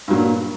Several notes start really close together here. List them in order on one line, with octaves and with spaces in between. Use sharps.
G2 F#3 A#2